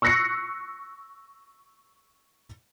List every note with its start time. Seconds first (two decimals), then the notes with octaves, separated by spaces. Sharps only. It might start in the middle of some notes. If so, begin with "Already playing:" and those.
0.02 C#6 E6 F#6 A#6 C7 C#7